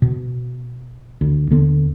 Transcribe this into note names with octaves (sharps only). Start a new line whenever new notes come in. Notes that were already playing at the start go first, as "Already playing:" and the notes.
B2
D2
D#2 D3 B3